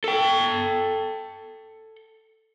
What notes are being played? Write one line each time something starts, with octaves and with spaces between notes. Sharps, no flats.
A4 G5